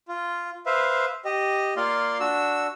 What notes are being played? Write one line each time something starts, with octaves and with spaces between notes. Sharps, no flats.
F4
B4 C5 E5 F5
G4 D#5
A#3 F4 D5 F5 C6
D4 F#4 E6